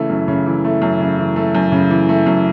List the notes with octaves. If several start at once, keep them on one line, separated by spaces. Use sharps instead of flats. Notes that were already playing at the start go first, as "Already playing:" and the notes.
Already playing: C#3 E3 A3
F#2
C#3
E3
A3
F#2
C#3
E3
A3
F#2
C#3
E3
A3
F#2